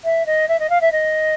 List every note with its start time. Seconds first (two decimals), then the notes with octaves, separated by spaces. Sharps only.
0.04 E5
0.26 D#5
0.48 E5
0.59 D#5
0.69 F5
0.81 E5
0.92 D#5